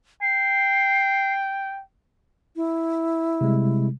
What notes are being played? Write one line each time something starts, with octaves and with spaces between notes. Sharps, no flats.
G5 C7
E4
C3 G3 G#3